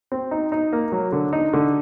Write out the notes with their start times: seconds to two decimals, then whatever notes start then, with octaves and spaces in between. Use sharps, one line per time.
0.12 C4
0.31 D#4
0.52 D#4
0.73 A#3
0.92 F#3
1.12 D3
1.33 D#4
1.53 D3